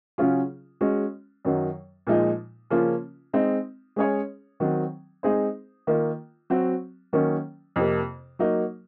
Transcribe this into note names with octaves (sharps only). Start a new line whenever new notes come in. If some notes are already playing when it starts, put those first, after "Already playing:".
C#3 F#3 C#4 F4 G#4
G#3 C#4 F#4
F#2 D#3 F#3
A#2 F3 G#3 D#4
C#3 F3 A#3 C#4 F4
G#3 C4 D#4
G#3 C#4 G#4 C#5
D#3 F#3 C4
G#3 C4 D#4 G#4 C5
D#3 A#3 F4
F#3 C4 F#4
D#3 F#3 A#3 C#4
F2 C3 F3 A#3
F#3 A#3 D#4 F#4